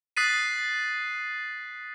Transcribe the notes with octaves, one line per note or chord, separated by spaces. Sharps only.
D#6 F#6 A6 B6 C7 D#7